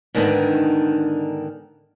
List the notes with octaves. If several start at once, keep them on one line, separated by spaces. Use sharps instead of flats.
G#2 D3 D#3 G#3 B3 D4